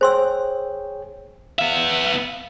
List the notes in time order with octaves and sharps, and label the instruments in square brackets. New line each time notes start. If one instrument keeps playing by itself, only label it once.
[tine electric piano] G#4 C#5 G5 [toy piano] C5 C6 E6
[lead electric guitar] B3 E5 [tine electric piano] F5